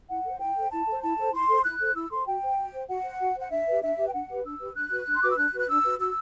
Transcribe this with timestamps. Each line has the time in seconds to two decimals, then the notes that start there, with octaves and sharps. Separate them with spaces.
0.09 E4 F#5
0.24 A4
0.29 C5
0.40 E4 G5
0.55 A4 C5
0.71 E4 A5
0.87 A4 C5
1.02 E4 A5
1.18 A4 C5
1.33 E4 C6
1.48 A4 C5
1.64 E4 F#6
1.80 A4 C5
1.95 E4 E6
2.11 A4 C5 C6
2.26 F#4 G5
2.43 C5
2.57 F#4
2.74 C5
2.88 F#4 F#5
3.04 C5
3.20 F#4
3.36 C5 F#5
3.50 D4 E5
3.67 G4 B4
3.82 D4 E5
3.97 G4 B4
4.08 G5
4.13 D4 F#5
4.29 G4 B4
4.44 D4 E6
4.60 G4 B4
4.75 D4 F#6
4.90 F#4 B4
5.07 D4
5.15 C6
5.22 F#4 B4 D6
5.30 E6
5.37 D4 F#6
5.53 F#4 B4 F#6
5.68 D4 E6
5.84 F#4 B4
5.99 F#4 E6